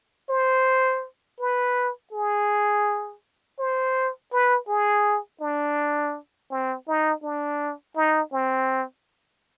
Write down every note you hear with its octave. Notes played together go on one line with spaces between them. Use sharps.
C5
B4
G#4
C5
B4
G#4
D4
C4
D#4
D4
D#4
C4